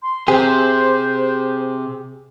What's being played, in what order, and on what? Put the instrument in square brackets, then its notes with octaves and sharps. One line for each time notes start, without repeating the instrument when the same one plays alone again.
[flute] C6
[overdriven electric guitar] C3 [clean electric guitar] G4 G#4 [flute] C5